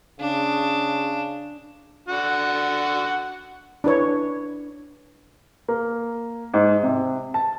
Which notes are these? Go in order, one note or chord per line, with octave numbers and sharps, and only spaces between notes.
C#3 D4
D3 F#4 F#5
D4 E4 B4 C#5
A#3
G#2
C3
A5